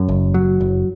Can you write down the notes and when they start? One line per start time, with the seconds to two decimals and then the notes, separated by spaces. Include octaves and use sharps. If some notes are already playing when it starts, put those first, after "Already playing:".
Already playing: F#2
0.09 F#1
0.34 F#3
0.61 F#1